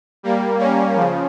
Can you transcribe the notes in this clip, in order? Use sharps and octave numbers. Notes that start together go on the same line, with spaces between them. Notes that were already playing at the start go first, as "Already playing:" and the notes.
G3 A#3
A#3 C#4
C#3 F3